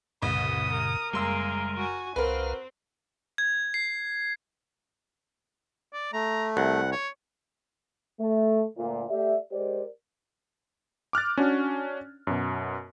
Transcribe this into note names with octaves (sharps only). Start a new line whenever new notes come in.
C2 F#2 A#2 C#3 B4 D#6
A#4
F#1 G3 G#3 A#3 G#4 C6 E6
F#4 G#5
C2 C4 F#4 A#4 B4 F5
G#6
C7
D5
A3 A#5
C2 F#5
C#5
A3
D2 A#2
A3 G4 D5 E5
G#3 G4 A#4 C5 D5
D6 F6 F#6 A6
C#4 D4 F#4
F#2 B2